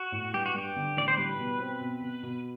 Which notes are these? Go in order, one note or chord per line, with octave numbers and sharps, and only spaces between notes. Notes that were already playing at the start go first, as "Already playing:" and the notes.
Already playing: F#4
A2
G2 G4
F#4
G2 G4
D3
A1 D5
C5
G3 B4
B2
C4
B2
B2
B2